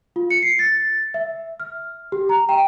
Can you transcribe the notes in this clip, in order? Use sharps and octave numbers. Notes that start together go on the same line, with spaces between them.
F4
C#7
C7
A6
E5
F6
G4
A#5
G5